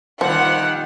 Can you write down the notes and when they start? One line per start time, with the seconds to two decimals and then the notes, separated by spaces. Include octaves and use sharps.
0.21 A#2 D#3 F3 G3 F#5